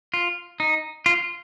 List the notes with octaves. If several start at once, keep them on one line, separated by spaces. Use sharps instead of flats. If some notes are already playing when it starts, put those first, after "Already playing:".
F4
D#4
F4